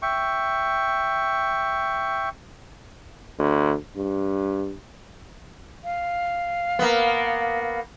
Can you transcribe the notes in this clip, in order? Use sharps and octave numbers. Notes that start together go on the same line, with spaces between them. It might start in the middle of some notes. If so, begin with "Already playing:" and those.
E5 G5 C#6
D2
G2
F5
A#3 B3